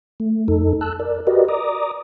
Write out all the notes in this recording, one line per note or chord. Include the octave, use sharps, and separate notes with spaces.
A3
F2 D#4 A4
A5 E6 F#6
A#4 D5
F#4 G4 A#4 B4 D5 D#5
D5 A#5 D6 D#6